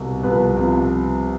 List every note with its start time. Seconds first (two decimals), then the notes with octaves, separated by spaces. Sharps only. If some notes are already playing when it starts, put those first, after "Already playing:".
Already playing: C2 B2
0.23 C2 C3 F3 B3 B4
0.57 C2 C3 F3